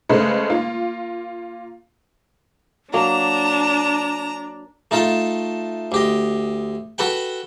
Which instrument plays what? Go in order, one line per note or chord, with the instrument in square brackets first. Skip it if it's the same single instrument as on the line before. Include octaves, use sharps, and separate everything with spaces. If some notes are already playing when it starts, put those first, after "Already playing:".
[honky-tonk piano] C#3 G#3 A3 B4 C5
A#3 F4
[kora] F#3 A#3 [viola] D4 [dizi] A5 [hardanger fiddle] A#5
[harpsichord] A3 D#4 F4 A4 A5
D2 G4 D#5
F#4 A4 B4 F#5 G5